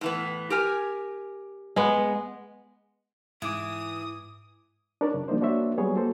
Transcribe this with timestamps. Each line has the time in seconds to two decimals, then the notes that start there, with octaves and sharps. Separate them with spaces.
0.01 A2 E3 B3
0.50 G4 A#4 G#5
1.76 G#3 B3
3.42 G#2 E3 D6 D#6
5.01 D4 D#4 A#4 C#5 D5
5.14 F#2 C#3
5.28 F3 G3 A#3 D4 D#4 C5
5.41 A#3 D4 F#4 C5 C#5 E5
5.78 F#3 G3 B3 G#4 C#5
5.96 A#3 F#4 A4 C5